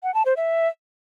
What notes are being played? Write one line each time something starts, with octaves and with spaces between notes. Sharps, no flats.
F#5
A5
C5
E5